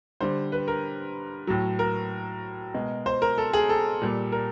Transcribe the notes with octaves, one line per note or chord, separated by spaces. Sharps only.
D3 G3 C5
B4
A#4
A2 F#3
A#4
B2 G#3
C5
A#4
A4
G#4
A4
A#2 G3
A#4